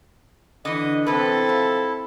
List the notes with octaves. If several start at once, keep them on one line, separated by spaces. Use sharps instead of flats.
D3 E3 D#5
E2 C3 C4 E4 A4 B4 A5
F3